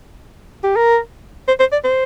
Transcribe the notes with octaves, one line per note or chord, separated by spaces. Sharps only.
G4
A#4
C5
C5
D5
C5